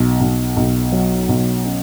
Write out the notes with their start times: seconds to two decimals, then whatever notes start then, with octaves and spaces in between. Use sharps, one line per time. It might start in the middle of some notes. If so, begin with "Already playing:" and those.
Already playing: B1
0.21 B1
0.57 B1
0.92 F#3
1.29 B1
1.65 C#4